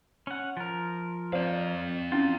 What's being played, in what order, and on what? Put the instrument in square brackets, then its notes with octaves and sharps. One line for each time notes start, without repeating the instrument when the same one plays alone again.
[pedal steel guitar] C#4 F#5
F3 A#4
[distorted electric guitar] C4 F5 [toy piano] C5 D5
[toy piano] C#4 E4 [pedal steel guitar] F4